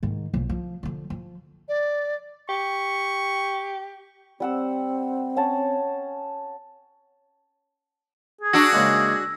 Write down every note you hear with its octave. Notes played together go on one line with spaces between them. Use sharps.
G#2 D#3
B1 F3
F3
D3 F3
F3
D5
G4 C#6
G3 C4 F#5 E6
C#4 F#5 A5
G#4
D4 F#4 E6 A#6
C#3 G#3 A#3